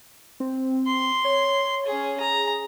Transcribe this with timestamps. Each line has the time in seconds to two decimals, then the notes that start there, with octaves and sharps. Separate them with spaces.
0.40 C4
0.86 C6
1.24 C#5
1.86 C#4 G#4
2.20 G#4 A#5